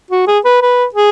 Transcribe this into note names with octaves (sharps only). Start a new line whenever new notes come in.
F#4
G#4
B4
B4
G#4